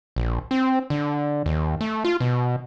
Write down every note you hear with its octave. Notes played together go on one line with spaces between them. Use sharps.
A#1
C4
D3
D#2
A3
F4
B2